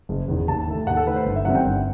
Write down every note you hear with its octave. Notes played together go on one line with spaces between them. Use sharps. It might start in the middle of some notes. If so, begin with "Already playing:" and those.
F#1
E2 D#3
D#2 A5
D#3 A3
D#2 F#5
A4
D#3 A3 B4
C5
G1
E5
F#2 D#3 G3 C4 F#5
G5
G1